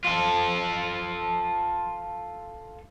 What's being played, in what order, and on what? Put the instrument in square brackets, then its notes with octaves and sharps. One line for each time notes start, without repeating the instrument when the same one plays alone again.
[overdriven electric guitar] F4 A4